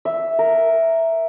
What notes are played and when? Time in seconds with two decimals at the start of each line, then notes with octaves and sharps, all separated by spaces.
0.05 E5
0.39 A#4